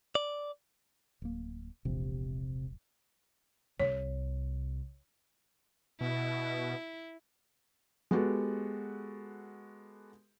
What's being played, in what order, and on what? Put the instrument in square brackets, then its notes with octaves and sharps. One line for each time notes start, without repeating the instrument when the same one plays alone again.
[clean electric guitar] D5
[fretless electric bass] D1 A#3
[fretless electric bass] E1 A#1 [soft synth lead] C3
[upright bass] C2 C3 [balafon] C#5
[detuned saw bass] B2 [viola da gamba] E4
[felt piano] G#3 B3 F#4 G4 A4